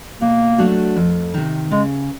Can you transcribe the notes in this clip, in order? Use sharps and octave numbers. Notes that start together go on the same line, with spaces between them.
B2 A#3
F#3 A3 D4 F#4
F2
C3 D#3
C#3 G#3